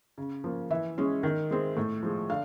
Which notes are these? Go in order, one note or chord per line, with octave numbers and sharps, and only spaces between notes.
C#3
F3 A#3
E3 E5
G#3 C#4
D#3
G#3 C4
A2
F3 G#3
D3 F5